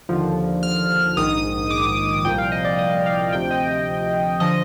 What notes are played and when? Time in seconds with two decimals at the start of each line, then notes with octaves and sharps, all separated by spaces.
0.09 D#2 D3 F3
0.63 F6
1.17 A#1 G#2 D#3 D#6
1.71 D6
2.25 C2 A#2 F3 G5
2.38 F5
2.52 D#5
2.65 D5
2.79 D#5
3.06 F5
3.33 D2 C3 F3 G5
3.51 D#5
4.40 D3 F3 D#5